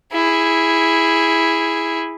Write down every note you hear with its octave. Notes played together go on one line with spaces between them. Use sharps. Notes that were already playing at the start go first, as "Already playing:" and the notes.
E4 G#4